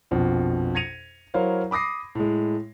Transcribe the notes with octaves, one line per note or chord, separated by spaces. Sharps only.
A#1 F2 B2
G#6 A#6 C#7 D#7 F7
F#3 E4 A#4 C5 C#5 F5
B5 D6 D#6 A#6 C7
A2 G#3